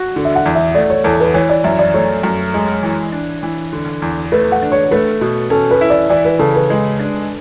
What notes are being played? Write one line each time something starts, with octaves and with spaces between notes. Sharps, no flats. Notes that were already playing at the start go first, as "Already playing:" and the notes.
Already playing: F#4
D3
E5
F#5
E2
E5
A3 D5
C#5
E2 A4
B4
E3 C#5
D5
F#2 E5
D5
A3 C#5
F#2
G#3
E3
D4
E3
D3
E2
A3 B4
F#5
D4
C#5
A3 B4
B2
C#4 A4
B4
E4
D5
E3 D5
B4
C#3 A4
B4
G#3
D4